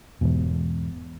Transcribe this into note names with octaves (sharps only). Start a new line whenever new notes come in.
E2 G#2 B2